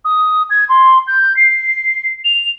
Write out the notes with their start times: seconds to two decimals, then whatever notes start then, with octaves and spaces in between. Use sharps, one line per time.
0.05 D#6
0.50 G#6
0.69 C6
1.07 G6
1.37 C7
2.25 F7